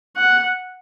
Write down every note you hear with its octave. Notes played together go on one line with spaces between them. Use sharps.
F#5